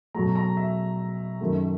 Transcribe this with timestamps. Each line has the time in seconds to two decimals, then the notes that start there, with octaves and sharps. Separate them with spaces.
0.15 B2 F#3 A3 A#5
0.36 A#5
0.57 E5
1.41 F#2 D#3 F#3 A3